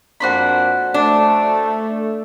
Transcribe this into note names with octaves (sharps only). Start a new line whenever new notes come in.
F2 A#3 D4 F#4 C5 B5
A3 D4